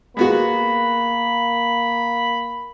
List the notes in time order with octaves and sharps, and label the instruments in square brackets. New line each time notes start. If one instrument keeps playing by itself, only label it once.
[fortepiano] G#3 B3 F#4 [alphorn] A#3 [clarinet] B5